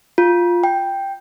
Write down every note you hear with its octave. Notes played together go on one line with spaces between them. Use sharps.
F4
G5